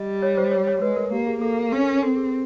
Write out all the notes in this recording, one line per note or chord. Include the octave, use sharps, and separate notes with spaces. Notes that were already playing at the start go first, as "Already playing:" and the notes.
Already playing: G3 D#5
C#5
C5
C#5
C#5
G#3 B4
A#4
A#3 G4
G#4
A#3 A4
A#4
C#4 A4
A#4
A#4
C4 A4
G#4